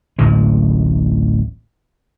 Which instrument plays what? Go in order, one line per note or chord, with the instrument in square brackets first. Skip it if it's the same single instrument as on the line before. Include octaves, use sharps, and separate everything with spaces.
[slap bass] D1 A1 G#3